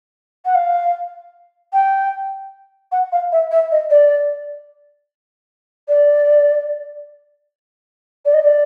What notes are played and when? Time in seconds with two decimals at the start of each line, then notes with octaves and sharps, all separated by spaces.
0.46 F#5
0.55 F5
1.73 G5
2.92 F#5
3.12 F5
3.32 E5
3.51 E5
3.72 D#5
3.91 D5
5.88 D5
8.26 D5
8.34 D#5
8.43 D5